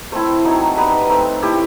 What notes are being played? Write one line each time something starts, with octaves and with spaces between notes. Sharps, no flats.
A3 C4 E4 C5
F#3 C4 D#4
G3 B3 D#4 B4
A3 C4 D#4
A3 E4 G4